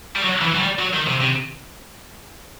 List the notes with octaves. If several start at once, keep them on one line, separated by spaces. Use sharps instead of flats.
G3
F#3
E3
F#3
G3
F#3
D#3
C3
C3